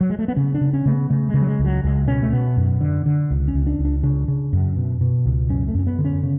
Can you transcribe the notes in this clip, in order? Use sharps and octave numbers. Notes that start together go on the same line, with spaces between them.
F#3
G#3
A3
B3
C#3 C#4
D4
C#3
C#4
C#3 A3
B3
C#3 A3
G#3
C#3
F#3
G#3
C#2
F#3
C#2 G#3
B2 C#4
A3
B2 B3
F#2
D3
D3
C#2
C#4
C#2
D4
C#2
D4
C#3 D4
C#3
F#2
B2
B2
C#2
F#2 C#4
A3
F#2 C#4
B3
D3
C#4
C#3